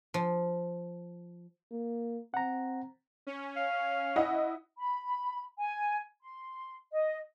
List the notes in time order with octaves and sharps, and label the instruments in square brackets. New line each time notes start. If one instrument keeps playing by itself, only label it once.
[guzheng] F3
[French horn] A#3
[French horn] C4 [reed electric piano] F#5 A#5
[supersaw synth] C#4
[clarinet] F5
[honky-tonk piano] E4 D#5 F#5
[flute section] B5
G#5
C6
D#5